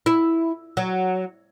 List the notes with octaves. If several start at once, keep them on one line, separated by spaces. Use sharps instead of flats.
E4
F#3